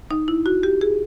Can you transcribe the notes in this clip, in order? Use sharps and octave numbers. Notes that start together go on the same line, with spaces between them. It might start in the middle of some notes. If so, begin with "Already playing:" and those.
D#4
E4
F#4
G4
G#4